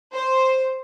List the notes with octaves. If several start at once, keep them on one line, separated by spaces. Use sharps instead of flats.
C5